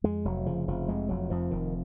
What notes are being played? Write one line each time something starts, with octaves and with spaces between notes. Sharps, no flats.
F2 G#3
F1 F#3
C#3 F3
F1 F3
F2 G#3
F1 F#3
F2 F3
F1 D#3